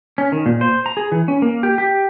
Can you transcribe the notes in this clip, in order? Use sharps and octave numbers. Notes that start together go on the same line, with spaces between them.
C#4
D#3
A#2
C5
A#5
G#4
E3
C#4
A#3
G4
G4